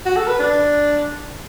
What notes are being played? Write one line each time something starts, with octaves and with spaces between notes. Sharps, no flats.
F#4
A4
B4
D4